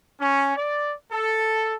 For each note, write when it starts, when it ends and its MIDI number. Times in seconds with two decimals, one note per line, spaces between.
0.20 0.53 61
0.56 0.93 74
1.12 1.74 69